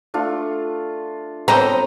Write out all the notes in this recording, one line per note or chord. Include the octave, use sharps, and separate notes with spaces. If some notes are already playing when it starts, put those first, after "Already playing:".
A3 D4 F4
B3 C4 A4 B4 C5 D#5 A#5